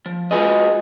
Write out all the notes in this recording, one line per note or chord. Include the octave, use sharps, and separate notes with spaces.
F3
G#3 F4 F#4 G#4 B4 D#5